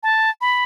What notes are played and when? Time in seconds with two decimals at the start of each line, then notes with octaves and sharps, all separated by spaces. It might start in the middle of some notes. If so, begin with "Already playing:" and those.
0.03 A5
0.41 B5